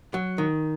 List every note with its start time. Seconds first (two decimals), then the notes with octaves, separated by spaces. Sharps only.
0.14 F#3
0.38 D#3